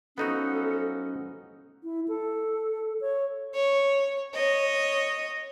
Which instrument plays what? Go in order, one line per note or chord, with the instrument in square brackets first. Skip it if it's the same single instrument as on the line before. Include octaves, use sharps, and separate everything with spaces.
[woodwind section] F3 F#3 C#4 [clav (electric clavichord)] B3 D#4 F#4 [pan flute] A4
[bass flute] E4
A4
C#5
[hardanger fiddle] C#5
C#5 D#5